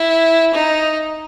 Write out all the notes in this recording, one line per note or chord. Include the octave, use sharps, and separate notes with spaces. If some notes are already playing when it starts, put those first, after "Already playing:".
Already playing: E4
D#4